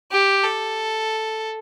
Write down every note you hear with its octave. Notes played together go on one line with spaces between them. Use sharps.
G4
A4